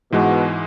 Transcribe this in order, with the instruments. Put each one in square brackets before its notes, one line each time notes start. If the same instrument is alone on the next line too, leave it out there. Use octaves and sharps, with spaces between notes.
[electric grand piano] G#2 E3 G#3 [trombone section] B2